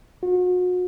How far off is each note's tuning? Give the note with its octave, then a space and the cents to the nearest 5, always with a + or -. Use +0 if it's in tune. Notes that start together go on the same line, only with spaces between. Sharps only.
F#4 -35